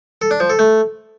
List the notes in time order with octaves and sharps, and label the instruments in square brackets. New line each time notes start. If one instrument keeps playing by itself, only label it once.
[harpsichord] A4
D4
F3
A4
A3